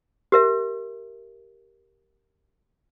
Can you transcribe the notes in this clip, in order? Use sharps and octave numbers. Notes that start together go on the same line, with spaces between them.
G4 A#4 E5